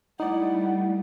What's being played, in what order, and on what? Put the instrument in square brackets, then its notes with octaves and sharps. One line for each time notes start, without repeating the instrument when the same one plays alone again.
[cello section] G3 A3 [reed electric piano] D#4 D5 [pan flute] E4 [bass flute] F#5